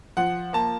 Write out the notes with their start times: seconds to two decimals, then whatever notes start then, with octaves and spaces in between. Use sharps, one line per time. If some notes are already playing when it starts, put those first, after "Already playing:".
0.17 F3 F#5
0.53 A#3 A5